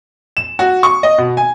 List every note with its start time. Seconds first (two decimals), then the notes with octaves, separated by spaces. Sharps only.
0.37 E7
0.59 F#4
0.83 C#6
1.03 D#5
1.18 B2
1.37 G#5